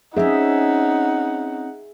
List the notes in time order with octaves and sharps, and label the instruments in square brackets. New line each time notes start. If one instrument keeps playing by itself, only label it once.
[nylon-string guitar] C4 C#4 [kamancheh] D#4 F#5 [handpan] G#4 E5